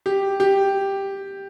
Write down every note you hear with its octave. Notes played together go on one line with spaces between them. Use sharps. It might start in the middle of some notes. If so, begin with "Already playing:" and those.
G4
G4